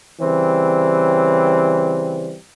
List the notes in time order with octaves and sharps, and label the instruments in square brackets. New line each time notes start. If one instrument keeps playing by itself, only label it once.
[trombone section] C#3 E3 G3 C4